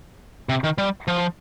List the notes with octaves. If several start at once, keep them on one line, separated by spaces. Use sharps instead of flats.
C3
D#3
G3
F3